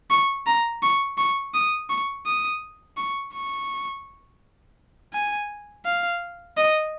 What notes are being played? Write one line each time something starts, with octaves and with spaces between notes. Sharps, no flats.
C#6
A#5
C#6
C#6
D#6
C#6
D#6
C#6
C#6
G#5
F5
D#5